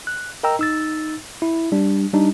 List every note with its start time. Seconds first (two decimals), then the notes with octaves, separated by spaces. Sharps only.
0.07 F#6
0.43 A#4 D#5 G5 A#5 E6
0.59 D#4 E6 A6
1.42 E4
1.72 G3 D4
2.13 G3 D4 D#4